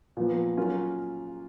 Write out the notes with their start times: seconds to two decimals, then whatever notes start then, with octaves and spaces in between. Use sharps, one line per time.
0.17 A#2 F3 B3
0.57 F#3 A#3 C#4 F4